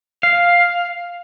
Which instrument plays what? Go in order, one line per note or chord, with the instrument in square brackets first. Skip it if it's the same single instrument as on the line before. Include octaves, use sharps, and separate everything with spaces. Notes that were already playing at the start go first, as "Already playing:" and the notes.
[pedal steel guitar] F5